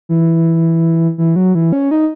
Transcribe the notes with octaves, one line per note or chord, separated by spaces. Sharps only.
E3
E3
F#3
E3
C#4
D#4